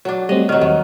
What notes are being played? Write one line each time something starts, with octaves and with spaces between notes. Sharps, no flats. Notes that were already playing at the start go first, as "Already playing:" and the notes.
F#3 D4
G3 A3 C4 D#5
D#3 F#3 F6
D#2 D#3